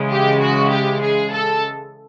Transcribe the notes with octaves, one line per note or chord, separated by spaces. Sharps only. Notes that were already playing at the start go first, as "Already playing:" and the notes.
Already playing: C#3 E3 G#3
G4
F#4
G4
G#4
A4